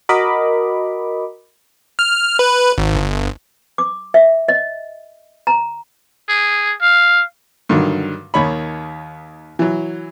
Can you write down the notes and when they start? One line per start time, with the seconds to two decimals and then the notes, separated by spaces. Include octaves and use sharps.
0.09 F#4 A#4 D#5 B5 D6
1.99 F6
2.39 B4
2.78 G#1
2.95 G1
3.78 D6
4.14 E5
4.48 D#5
5.47 A#5
6.29 G#4
6.82 F5
7.69 G2 D3 D#3 F#3
8.34 D#2 D#3 C#5 B5
9.59 E3 F#3